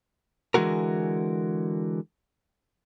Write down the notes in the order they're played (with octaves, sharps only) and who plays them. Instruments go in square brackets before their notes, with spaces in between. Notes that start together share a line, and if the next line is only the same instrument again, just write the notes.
[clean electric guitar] D3 E3 G#3 A3 F#4 A#4